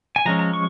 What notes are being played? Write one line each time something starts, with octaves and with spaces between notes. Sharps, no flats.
G#5
F3 G#3 C#4 A#5
A#5
C#6